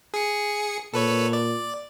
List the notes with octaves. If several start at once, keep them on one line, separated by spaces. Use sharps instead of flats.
G#4 C#7
A#2 A4 B4 C#5
D5